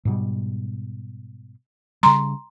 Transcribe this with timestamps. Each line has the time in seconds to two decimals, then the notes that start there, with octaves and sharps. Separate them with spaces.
0.05 G#2 B2 G3
2.03 C#3 G3 A#5 C6